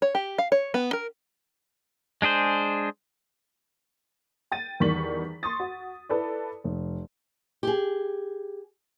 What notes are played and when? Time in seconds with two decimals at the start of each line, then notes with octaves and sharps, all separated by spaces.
0.02 C#5
0.15 G4
0.38 F5
0.52 C#5
0.74 B3
0.93 A#4
2.22 G#3 D4 G#4 C5
4.52 G5 A6 D#7
4.80 E2 D#3 G3 C#6 B6 F#7
5.43 C6 C#6 D#6 A6
5.60 F#4
6.09 E4 A4 B4 D5
6.64 F1
7.63 G4 G#4